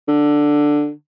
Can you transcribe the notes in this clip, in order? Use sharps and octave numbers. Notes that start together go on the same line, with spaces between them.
D3